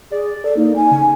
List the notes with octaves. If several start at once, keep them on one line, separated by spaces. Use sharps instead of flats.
G#4 D5
A4 D5
A#3 D#4
G#5
C#3